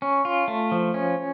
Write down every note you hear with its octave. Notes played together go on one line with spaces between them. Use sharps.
C#4
F4
A3
F3
C#4